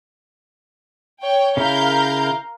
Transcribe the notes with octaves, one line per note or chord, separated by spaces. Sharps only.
C#5 G5
C#3 E4 A#4 F5 G6